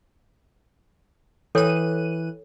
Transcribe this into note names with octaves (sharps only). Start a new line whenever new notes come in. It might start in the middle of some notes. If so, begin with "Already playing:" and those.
E3 A4 C#5 G5 F#6 D#7